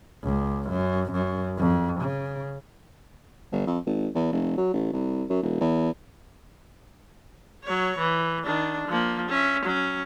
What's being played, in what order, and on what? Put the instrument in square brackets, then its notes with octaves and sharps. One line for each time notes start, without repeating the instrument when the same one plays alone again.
[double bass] C#2
F#2
F#2
F2
C#3
[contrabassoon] G1
F2
G#1
E2
F1
F#3
A1
C2
F#2
E1
E2
[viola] F#3 C#5
E3
D#3 D4
F3 A#3
C#4 E5
F#3 C#4